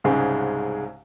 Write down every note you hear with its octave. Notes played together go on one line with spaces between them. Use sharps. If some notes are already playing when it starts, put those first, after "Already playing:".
C2 G#2 C#3 G#3